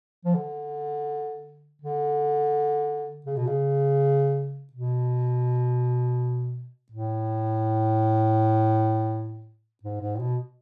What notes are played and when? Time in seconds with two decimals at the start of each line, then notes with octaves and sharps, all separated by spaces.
0.25 F3
0.35 D3
1.81 D3
3.26 C#3
3.37 B2
3.47 C#3
4.73 B2
6.92 A2
9.83 G#2
10.01 G#2
10.15 A2
10.19 B2